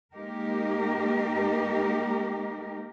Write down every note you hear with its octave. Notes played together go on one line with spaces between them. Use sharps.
G#3 A#3 D#4 G4 A#4